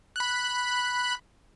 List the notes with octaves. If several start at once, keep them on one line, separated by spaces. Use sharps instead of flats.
B5 F#6